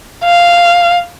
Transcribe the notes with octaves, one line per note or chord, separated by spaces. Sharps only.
F5